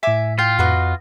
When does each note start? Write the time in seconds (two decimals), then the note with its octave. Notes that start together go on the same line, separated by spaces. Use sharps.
0.03 A2 E5 G#5 D6 B6
0.39 F4 G5
0.59 F2 F#4 B4 D#5